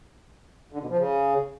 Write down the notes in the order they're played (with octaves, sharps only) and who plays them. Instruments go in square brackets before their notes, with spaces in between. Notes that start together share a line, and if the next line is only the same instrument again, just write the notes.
[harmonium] D3
B2
F3
C#3